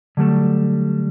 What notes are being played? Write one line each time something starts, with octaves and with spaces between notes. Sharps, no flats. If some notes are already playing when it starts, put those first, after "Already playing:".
D3 F#3 G3 A3 A4